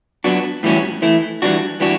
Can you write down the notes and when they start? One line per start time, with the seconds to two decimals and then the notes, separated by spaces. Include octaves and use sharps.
0.24 F#3 B3 D4 F#4
0.63 A2 E3 G3 C#4 F#4
1.02 E3 A3 E4
1.42 E3 G3 D4 F#4
1.80 E3 G3 D4 F#4